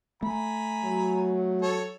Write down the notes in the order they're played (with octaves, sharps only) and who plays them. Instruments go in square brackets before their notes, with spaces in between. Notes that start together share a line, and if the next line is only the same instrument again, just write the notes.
[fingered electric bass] A3 [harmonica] G#5 A#5 B5
[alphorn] F#3
[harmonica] A4 C#5